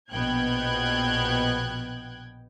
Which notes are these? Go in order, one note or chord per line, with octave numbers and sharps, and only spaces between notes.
A#1 B2 B3 G5 F#6 G#6